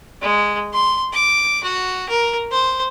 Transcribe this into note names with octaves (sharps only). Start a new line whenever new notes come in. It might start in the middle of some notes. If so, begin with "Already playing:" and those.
G#3
C6
D6
F#4
A#4
C5